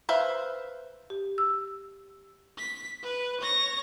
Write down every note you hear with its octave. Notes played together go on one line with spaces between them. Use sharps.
B4 C5 E5 F5
G4
E6
B6
B4
C#5 A#6